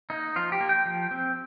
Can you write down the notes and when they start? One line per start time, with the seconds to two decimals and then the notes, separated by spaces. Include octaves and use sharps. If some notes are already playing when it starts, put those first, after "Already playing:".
0.10 A#3 D#4
0.36 F3 F4
0.52 G4
0.60 A#3
0.69 G5
0.86 F3
1.11 C4